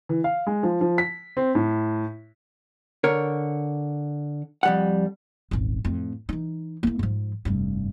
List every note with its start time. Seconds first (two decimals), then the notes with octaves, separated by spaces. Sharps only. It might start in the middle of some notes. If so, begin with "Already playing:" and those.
0.09 E3
0.24 F5
0.47 G#3
0.63 F3
0.81 F3
0.98 B6
1.37 C4
1.55 A2
3.04 D3 A#4 C#5
4.63 F2 G3 F#5
5.51 D#1 G#1
5.85 F2 A2
6.29 E3 D#4
6.83 A#3 E4
6.99 G#2 F3
7.45 F1 G2